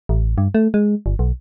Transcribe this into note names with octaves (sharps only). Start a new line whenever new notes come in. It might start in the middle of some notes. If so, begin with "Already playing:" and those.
A1
G2
A3
G#3
G1
B1